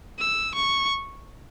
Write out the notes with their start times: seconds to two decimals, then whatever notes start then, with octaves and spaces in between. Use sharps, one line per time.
0.19 E6
0.55 C#6